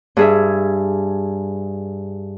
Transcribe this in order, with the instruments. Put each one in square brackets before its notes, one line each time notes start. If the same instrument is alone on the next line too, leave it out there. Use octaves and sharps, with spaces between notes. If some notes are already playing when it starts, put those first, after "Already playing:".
[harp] G2 G#4 E5